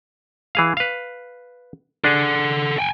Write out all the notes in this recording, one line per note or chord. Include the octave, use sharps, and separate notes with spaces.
E3 G#4 F5
B4 F5
D4 G#4 A4 F#5
G5 G#5